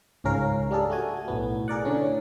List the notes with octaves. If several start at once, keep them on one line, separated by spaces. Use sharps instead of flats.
C#2 G#2 C#4 A#4 F5
G3 D4 G#4 A4
A3 F#4 G#5
B1 A2 B3
G#4 A#4 D5 F#5
A2 D3 C#4